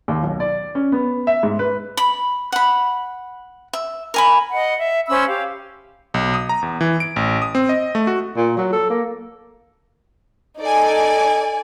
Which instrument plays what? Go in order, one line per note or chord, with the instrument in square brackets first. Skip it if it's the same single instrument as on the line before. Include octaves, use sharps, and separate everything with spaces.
[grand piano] D#2
B1
D5
C#4
B3
E5
G#2
B4
[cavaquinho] B5
F#5 B5
E5
A#4 G#5 B5
[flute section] D#5 F#5
E5
C#4 C5 B5 E6
G4 F5
[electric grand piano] B1
D#6
A#5
E2
E3
D7
A1
D#6
C4
D#5
A3
F#4
[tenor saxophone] A#2
F#3
A4
A#3
[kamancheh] D#4 A4 [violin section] D5 G#5